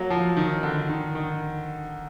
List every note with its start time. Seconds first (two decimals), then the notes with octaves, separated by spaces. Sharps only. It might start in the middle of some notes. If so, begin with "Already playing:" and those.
Already playing: F#3 A#3
0.10 F3
0.37 D#3
0.63 D3
0.89 D#3
1.15 D#3